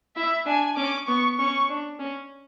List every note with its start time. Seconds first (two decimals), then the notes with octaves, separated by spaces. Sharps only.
0.16 E4 E5
0.46 D4 G#5
0.77 C#4 D6
1.07 B3 C#6
1.38 C#4 C#6
1.69 D4
1.99 C#4